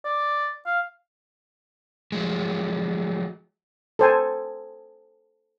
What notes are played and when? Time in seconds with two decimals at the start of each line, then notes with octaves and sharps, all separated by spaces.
0.04 D5
0.66 F5
2.12 F3 F#3 G#3
3.99 A4 C5 G#5